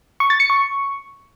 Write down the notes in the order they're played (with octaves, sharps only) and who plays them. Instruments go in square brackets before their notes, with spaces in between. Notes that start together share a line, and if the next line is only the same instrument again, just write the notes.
[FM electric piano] C#6
A6
C#7
C#6